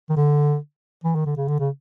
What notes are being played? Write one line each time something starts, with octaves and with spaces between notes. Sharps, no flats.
D#3
D3
E3
D#3
D3
C#3
D3
C#3